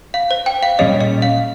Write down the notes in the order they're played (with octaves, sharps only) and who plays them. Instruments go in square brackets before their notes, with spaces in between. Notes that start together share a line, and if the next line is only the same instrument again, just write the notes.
[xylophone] F5
C5
G5
F5
[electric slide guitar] A#2 G3 C#4 G#4 C#5 [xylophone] D#5
[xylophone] D#5
F5